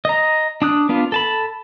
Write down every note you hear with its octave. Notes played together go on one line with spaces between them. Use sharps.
D#5 A#5
D4 D#6 F#6
B3 D4 F4
A4 A5 B5